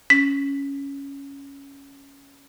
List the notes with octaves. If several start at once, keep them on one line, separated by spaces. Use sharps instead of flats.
C#4 B6